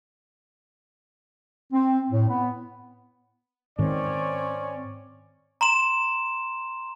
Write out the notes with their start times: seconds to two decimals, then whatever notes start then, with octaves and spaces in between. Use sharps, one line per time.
1.73 C4
2.10 A2
2.28 B3
3.79 G#2 D#3 C4 C#4 C#5 D5
5.61 A#5 C6 E7